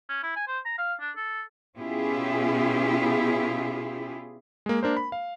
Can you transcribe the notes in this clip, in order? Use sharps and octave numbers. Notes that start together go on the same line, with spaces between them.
C#4
E4
G#5
C5
A#5
F5
D4
A4
B2 C#4 E4 F4 G4 G#4
G#3 A#3
A#3 D4 A#4 C5
B5
F5